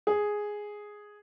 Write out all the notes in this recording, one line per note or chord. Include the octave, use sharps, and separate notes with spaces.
G#4